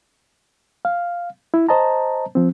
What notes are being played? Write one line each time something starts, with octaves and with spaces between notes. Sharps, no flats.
F5
E4
C5 D#5 A5 A#5
F3 C4